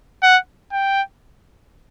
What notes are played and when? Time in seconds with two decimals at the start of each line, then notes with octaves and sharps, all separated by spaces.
0.23 F#5
0.72 G5